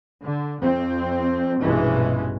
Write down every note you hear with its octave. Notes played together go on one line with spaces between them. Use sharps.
D3
F2 C4
A#1 G2 B2 E3 G#3 C#4